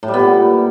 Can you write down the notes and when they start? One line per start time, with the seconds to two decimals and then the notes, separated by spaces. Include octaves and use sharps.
0.03 A2
0.08 G3
0.14 B3
0.19 A#2